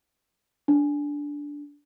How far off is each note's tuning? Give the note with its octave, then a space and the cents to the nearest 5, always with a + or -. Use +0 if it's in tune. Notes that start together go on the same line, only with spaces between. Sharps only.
D4 -10